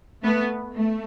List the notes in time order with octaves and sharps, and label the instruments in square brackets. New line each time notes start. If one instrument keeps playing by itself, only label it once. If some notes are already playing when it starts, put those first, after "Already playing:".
[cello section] A3 B3
A3